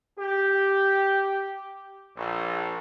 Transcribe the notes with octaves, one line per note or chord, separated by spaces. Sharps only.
G4
A#1